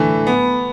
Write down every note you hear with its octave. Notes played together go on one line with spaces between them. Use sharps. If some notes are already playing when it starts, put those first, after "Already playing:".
Already playing: D3 E3 A3
B3